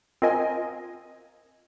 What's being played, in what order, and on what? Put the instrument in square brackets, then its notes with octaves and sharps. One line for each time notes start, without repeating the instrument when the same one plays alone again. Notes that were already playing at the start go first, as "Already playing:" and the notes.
[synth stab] C4 F4 A#4 D#5 G#5